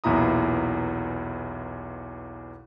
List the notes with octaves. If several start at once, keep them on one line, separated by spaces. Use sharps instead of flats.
B1 E2 A#2 E4 A#5 D#6